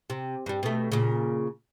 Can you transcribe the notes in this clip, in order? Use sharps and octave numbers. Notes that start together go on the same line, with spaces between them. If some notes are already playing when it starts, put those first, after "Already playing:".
C3
G2 G3
B2 A3
A#2 C#3